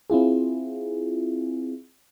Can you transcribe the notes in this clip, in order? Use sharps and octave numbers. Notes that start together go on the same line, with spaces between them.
C4 E4 F4 G#4